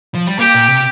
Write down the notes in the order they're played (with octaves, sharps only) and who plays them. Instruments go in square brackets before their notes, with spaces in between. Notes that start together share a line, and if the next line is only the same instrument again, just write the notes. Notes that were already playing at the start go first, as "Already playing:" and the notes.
[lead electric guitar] F3
G3
[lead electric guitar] A#3 [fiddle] G4
[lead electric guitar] A#2
C3